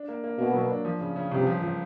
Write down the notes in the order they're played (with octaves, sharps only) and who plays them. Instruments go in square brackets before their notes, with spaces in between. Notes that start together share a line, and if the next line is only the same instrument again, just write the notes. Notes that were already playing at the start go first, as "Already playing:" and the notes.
Already playing: [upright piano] D4
A#3
A#3
[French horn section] B2 [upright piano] A#3
[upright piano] F#3
D4
F3
C#3
C#3
[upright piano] G1 [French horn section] C3
[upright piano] F3
F3